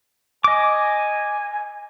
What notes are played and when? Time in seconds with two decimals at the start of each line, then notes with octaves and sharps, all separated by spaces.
0.44 D#5 G#5 D6